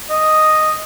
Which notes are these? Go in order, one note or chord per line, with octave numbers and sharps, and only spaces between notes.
D#5